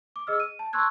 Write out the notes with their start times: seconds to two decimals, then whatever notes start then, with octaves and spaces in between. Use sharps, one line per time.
0.16 D6
0.27 G#4 D#5 E6 F6
0.40 D#7
0.59 A5
0.73 A5 C6 C#6 E6 F#6 G#6